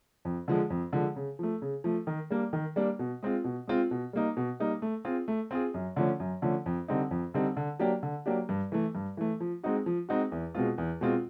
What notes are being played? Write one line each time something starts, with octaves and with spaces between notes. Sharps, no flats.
F2
D3 F3 G#3
F2
D3 F3 G#3
C#3
F3 A3
C#3
F3 A3
D#3
G3 A#3 D4
D#3
G3 A#3 D4
B2
G#3 C4 F4
B2
G#3 C4 F4
B2
G3 A#3 D#4
B2
G3 A#3 D#4
A3
C4 F4 G#4
A3
C4 F4 G#4
F#2
D3 F3 A3 C#4
F#2
D3 F3 A3 C#4
F2
D3 G3 C4 D#4
F2
D3 G3 C4 D#4
D3
F#3 A#3 D4 G4
D3
F#3 A#3 D4 G4
G2
E3 A3
G2
E3 A3
F3
G#3 C4 D#4 F#4
F3
G#3 C4 D#4 F#4
E2
B2 G#3 C4 F4
E2
B2 G#3 C4 F4